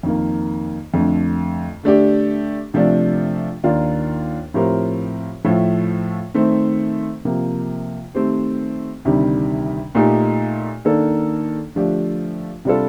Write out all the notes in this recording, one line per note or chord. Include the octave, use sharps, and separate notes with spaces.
F2 D#3 A#3
F2 D3 A3
D3 A3 D4 G4
C3 F3 A3 D4
D#2 D#3 A#3 D4 F4
A2 F3 C4 G4 A#4
A2 F3 A3
D#3 A3 C4
C3 F3 A#3
D#3 A3 C4 G4 C5
D2 C3 D#3 G3
A#2 A3 D#4 G4
D#3 A#3 D4 A4
D3 F3 A3 D4 G4
C3 G3 D4 F4 A4